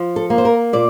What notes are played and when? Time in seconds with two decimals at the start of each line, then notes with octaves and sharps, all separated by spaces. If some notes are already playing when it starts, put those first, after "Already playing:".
Already playing: F3
0.16 A4
0.30 A#3
0.38 C5
0.45 A#4
0.73 A#2 D5